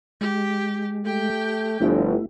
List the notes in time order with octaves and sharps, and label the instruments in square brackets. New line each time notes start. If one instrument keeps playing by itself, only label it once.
[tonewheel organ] G#3 [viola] G4
[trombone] A3 [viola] G4 G5
[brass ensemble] G1 [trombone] F3 [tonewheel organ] A3 E4